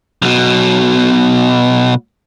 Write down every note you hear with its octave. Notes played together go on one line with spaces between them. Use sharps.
B1 B2